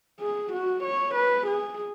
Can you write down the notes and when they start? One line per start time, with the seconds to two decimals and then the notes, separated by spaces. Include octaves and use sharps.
0.20 G#4
0.53 F#4
0.84 C#5
1.15 B4
1.47 G#4